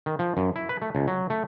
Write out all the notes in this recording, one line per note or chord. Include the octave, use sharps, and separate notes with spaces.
D#3
F3
F#2
E4
B4
A3
C#2
F#3
A3